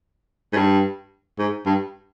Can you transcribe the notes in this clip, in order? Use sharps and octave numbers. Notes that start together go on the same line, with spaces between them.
G#2
G2
G#2
G2